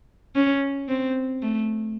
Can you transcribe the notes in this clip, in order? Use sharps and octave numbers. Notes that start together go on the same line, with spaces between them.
C#4
C4
A3